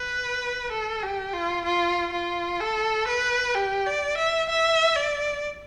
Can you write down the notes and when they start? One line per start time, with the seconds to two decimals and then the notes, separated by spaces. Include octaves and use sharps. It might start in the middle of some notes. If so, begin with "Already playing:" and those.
Already playing: B4
0.71 A4
1.03 G4
1.33 F4
1.65 F4
2.13 F4
2.60 A4
3.08 B4
3.55 G4
3.86 D5
4.18 E5
4.49 E5
4.96 D5